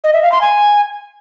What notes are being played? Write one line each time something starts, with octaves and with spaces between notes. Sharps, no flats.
D#5
E5
F5
C6
G#5